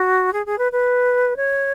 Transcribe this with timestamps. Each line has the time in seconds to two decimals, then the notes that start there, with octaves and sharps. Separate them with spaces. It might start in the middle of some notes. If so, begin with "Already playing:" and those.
Already playing: F#4
0.33 G#4
0.46 G#4
0.58 B4
0.72 B4
1.36 C#5